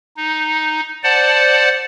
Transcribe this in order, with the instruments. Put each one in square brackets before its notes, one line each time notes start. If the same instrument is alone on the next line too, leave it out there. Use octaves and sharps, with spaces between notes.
[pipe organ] D#4
C5 D5 F#5 A5